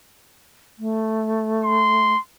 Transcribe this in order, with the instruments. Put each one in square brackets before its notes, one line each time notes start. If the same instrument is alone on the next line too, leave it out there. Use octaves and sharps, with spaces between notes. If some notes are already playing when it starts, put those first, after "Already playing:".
[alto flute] A3
[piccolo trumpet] C6